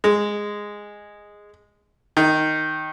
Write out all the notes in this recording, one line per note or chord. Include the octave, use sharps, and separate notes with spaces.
G#3
D#3